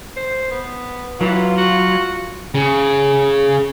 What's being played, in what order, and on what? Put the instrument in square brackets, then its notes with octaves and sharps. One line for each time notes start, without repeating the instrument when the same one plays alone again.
[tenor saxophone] C5
B3
[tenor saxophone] E3 [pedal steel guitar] F#3 [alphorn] F4
[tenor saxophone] F#4
[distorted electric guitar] C#3